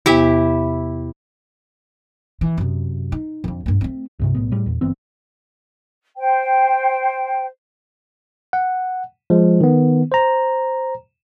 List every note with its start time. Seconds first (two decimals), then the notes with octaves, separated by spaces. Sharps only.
0.06 E2 C3 B3 E4 G4 E5
2.41 E3
2.57 F#2 C3
3.12 D#4
3.44 F2 D3
3.66 G2 A#3
3.81 A3 C4
4.19 C2 G2 C3
4.35 B1 A2 B3
4.52 A2 G3
4.66 E2 A#2
4.81 G1 E3 B3 C4
6.17 C5 G5
8.53 F#5
9.30 F3 G#3
9.61 D#3 B3
10.12 C5 A#5